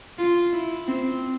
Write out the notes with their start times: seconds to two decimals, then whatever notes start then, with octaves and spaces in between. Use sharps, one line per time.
0.18 F4
0.53 E4
0.88 C4